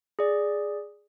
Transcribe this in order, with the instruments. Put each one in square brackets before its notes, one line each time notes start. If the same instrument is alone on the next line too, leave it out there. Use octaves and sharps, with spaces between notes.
[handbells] G#4 D5